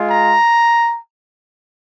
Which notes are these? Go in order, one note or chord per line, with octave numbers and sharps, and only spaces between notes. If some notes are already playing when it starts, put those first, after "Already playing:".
Already playing: G#3 F4
A#5